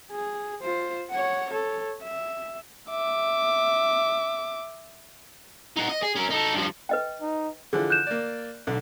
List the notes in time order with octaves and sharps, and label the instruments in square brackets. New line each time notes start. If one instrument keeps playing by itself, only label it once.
[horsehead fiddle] G#4
F4 C5
C#5 F#5
A4 C#5
E5
[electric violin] E5 D6
[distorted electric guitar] D#4 F#5
D#5
G#4
C#4 A#4
D#4 A4
G2 F3
[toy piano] B4 D#5 G5
[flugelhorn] D#4
[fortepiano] D3 E3 F3 [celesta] G#4
[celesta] F#6 G6 E7
[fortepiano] A#3 D5
B1 D3